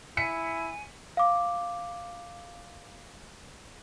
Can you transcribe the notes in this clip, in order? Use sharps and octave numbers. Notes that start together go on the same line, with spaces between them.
E4 G#5 B6 C#7
F5 D6